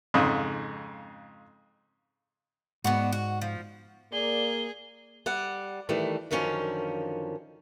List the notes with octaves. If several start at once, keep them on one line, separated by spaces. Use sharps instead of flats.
F2 G#2 C#3
G#2 B3 D4 F#4
F#4
F3
A#3 G#4 D5 G7
G3 D5 F#5
D#3 E3 G3 A3
F#2 D3 D#3 F3 C#4